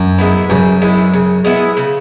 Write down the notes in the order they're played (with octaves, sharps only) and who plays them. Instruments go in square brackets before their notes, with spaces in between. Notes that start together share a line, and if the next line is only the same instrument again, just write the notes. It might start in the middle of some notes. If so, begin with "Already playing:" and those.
Already playing: [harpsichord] F#2
[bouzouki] G#3 B3 E4
[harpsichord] F#2 [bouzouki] C#3
[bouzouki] G#3 B3 E4
C#3
G#3 B3 E4
C#3